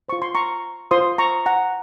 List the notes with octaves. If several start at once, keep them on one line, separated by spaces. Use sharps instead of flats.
F4 C5 C#6
C6
A#5 C#6
F4 C5 C6 D#6
A#5 C#6
F#5 A#5